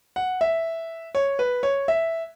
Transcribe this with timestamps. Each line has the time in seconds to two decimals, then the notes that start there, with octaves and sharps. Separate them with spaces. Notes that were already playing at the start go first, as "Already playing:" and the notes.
0.16 F#5
0.41 E5
1.15 C#5
1.39 B4
1.63 C#5
1.88 E5